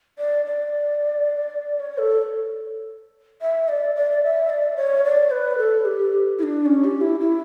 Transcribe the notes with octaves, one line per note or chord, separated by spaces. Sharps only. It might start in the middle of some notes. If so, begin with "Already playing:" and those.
D5
D5
C#5
A4
E5
D5
D5
E5
D5
C#5
D5
B4
A4
G4
E4
D4
C#4
G4
E4
E4